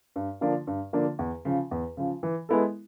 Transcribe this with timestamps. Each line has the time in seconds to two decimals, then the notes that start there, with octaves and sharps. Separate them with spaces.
0.16 G2
0.41 D3 F3 A#3 D4
0.67 G2
0.93 D3 F3 A#3 D4
1.19 E2
1.45 C#3 F3
1.71 E2
1.97 C#3 F3
2.23 E3
2.49 G#3 B3 E4 A4